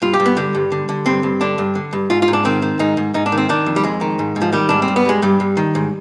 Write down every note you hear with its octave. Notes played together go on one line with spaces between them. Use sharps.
G2 F4
G4
G2
B3
D3 G3
G2
D3
D3
G2 C4
G2
D3 D4
G2
D3
G2
G#2 F4
F4
G#2
D4
D#3 C4
D#3
G#2 D#4
G#2
G#2 D#4
D4
D#3
C4
D#3 D4
F2
G3
F2 G#3
D#3
G#2
G#2
F3
D#3 G3
G#2 D4
C4
G2
B3
G2 G#3
G2 G3
G2
D#3
G#2